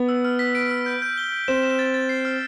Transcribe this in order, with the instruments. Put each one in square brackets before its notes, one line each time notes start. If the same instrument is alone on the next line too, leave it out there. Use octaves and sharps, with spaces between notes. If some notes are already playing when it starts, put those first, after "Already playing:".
Already playing: [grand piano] B3
[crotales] E6
F6
B6
D7
F6
G6
G6
G7
G6
[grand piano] C4 [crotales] E7
[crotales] E7
A6
A6
C7
F6